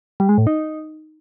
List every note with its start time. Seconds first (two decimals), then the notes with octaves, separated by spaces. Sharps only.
0.20 G3
0.29 G#3
0.38 A2
0.47 D#4